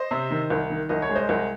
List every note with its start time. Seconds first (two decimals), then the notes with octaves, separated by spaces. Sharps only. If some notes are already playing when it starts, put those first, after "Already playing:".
Already playing: C5 D#5
0.11 C3
0.31 D#3
0.50 C2
0.70 D#3
0.89 C2 D#5
1.02 C#5
1.09 G#3
1.15 C5 D#5
1.29 C2